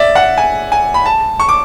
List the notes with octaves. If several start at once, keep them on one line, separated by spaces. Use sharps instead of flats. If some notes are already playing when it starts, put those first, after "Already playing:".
Already playing: D5 E5
F#5
G#5
G#5
B5
A5
C#6
D6